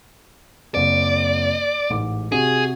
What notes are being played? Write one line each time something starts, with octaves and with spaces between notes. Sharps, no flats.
F#1 C4 D5
A1 G#2 D6
C3 F#4 G#4